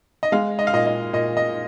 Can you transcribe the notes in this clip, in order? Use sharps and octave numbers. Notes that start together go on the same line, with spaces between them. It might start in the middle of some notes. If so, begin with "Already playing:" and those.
D#5
G#3 F5
D#5
F5
A#2 D#5
D#5
A#2 D#5
D#5